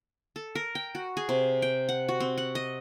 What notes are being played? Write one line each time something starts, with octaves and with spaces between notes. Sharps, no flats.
A4
A#4
G5
F#4
G#4
C3
G5
F#5
F#4
C4
F#5
D#5